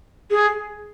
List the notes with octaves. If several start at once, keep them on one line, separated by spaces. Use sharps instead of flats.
G#4